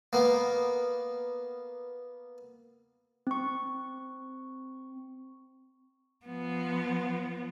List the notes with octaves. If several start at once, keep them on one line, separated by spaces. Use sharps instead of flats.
A#3 B3
C4 C#6
F3 B3